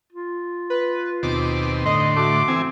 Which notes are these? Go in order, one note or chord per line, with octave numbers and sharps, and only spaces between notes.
F4
B4
D#2 B2 C4 D6
A2 D3 D#5 C6
A3 F#4 D6
E3 C4 G#5